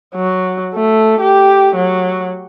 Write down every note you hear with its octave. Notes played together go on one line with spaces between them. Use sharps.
F#3
A3
G4
F#3